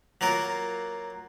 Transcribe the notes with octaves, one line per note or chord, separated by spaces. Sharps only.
F#3 A#3 F4 A#4